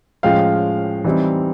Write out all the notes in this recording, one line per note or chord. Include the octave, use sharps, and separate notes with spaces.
A2 F3 G#3 C#4 F5 G5
E3 G3 C4 D#4